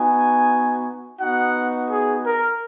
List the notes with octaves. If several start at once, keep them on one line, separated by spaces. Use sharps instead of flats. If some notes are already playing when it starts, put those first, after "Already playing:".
Already playing: B3 D#4 F#4 G#5
B3 D#4 F#4 F#5
G#4
A#4